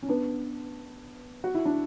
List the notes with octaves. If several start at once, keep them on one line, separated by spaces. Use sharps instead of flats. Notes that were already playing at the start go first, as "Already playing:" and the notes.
C#4
B3 D4
F#4
E4
D4